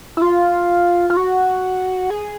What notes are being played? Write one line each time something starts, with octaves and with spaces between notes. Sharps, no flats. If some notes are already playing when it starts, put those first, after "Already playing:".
E4
F4
F4
F#4
G#4